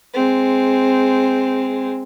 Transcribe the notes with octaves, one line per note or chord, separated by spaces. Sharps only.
G#3 C4